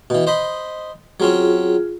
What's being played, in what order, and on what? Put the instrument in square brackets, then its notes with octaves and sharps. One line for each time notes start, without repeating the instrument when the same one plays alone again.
[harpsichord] B2 E3
C5 D#5 B5
[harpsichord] F#3 C4 C#4 [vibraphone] F4 G#4